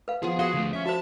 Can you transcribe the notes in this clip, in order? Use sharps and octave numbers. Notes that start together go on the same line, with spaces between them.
B4 F5
F3 B3 G#4
F#4 G#4 F5 C6
D3 A3
C#4 E5
F#4 C5 A5